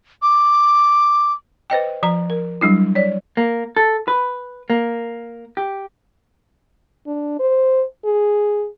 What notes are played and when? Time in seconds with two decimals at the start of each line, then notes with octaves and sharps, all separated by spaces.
0.22 D6
1.70 B4 C5 D#5 G5
2.03 F3 A#5
2.30 A#4
2.61 F#3 G3 D4 E4
2.95 C#5 D5
3.37 A#3
3.76 A4
4.08 B4
4.70 A#3
5.57 G4
7.07 D4
7.39 C5
8.05 G#4